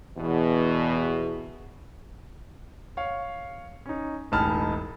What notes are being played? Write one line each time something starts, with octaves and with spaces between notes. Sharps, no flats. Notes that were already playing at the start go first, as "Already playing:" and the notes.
E2 B2
C#5 F5
C#4 D#4
E1 A1 D#4 A5 B5 F6